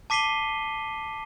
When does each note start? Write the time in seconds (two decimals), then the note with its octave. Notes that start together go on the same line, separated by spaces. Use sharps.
0.10 A5 D6 B6 C7 D#7 G7